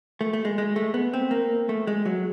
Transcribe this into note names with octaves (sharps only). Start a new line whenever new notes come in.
A3
A3
G#3
G#3
A3
B3
C4
A#3
A3
G#3
F#3